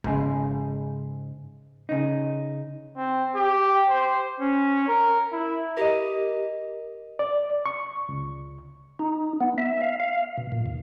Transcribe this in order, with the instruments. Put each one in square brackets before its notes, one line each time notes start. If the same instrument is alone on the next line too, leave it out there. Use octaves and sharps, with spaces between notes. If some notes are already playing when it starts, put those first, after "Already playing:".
[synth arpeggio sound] G#1 [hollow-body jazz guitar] G#2 C#3 G#3
[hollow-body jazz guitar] C#3 D#4
[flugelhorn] C4
G4
C5
C#4
A#4
E4
[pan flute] G4 [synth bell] A#4 D#5
[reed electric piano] D5
C#6
C#2
[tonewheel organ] D#4
B3
E5
F5
F5
B2
A#2
D#2